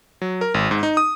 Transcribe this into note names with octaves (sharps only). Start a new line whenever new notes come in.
F#3
A#4
G#1
G#2
D#4
D#6